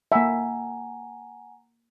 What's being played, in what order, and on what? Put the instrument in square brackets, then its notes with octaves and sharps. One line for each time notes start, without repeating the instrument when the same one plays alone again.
[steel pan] A#3 E5 [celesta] F#5 G#5 A#5